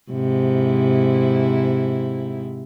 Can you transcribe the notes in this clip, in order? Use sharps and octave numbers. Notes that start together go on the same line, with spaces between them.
G#2 C3 E4